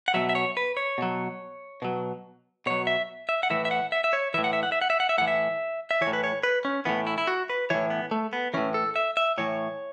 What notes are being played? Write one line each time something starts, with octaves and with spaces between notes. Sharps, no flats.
F#5
B2 F#3 E5
E5
C#5
B4
C#5
B2 F#3
B2 F#3
B2 F#3 C#5
E5
E5
F#5
A2 E3 E5
E5
F#5
E5
E5
C#5
A2 E3 E5
F#5
E5
F#5
E5
F#5
E5
F#5
E5
A2 E3 F#5
E5
E5
E3 C#5
A2
B4
C#5
B4
C#4
A2 E3 B3
E4
E4
F#4
B4
A2 E3 C#5
B3
A3
B3
A2 E3 C#4
A4
E5
E5
A2 E3 C#5